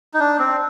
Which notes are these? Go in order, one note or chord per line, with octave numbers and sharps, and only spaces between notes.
D#4
D4
C4